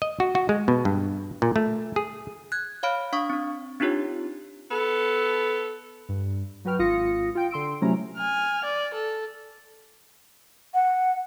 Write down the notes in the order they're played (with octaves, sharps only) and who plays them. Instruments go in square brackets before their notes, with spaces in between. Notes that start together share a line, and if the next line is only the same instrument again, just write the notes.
[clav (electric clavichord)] D#5
F#4
F#4
G#3
B2
G2
A#2
A3
G#4
[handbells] F#6 G#6
C#5 F5 B5 F6 D7
D4 F5 C#6 D#6
C4 D4
C4 D4 D#4 F4 G4 C#5
[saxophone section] B3 A4
[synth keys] G2
F#3 F#4 B4 G5 F6
G#1 F4 D#6 A#6 C#7
F4 G5 D7
D3 C6 E6 D7
C3 F#3 A3 C#4 E4 A#5
[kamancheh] G#5 F6
D5
A4
[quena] F#5